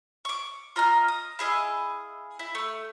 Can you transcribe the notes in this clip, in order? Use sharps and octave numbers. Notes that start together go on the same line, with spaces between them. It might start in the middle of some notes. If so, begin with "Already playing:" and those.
C#6 D6
F4 D#5 A#5 F6
D#6
E4 G#4 D#5 F5
E4
A3